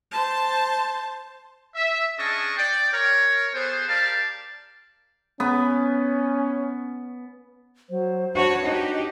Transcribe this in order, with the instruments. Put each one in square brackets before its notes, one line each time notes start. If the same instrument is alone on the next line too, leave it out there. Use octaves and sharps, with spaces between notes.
[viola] C5 A5
[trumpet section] E5
C#4 D4 G#4 D#5 A5 C#6
D5 G5
A#4 C#5
B3 G#4 A4 C5
G4 A#4 D5 F5 A5
[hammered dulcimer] B3 [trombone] C#4
[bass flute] F#3 [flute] C5
[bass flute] D4 [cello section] F#4 B4 C#5
[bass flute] D4 [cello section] D#4 G4 [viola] F#4 [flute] D#5